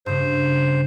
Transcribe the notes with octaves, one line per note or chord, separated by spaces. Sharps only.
G2 C#3 C5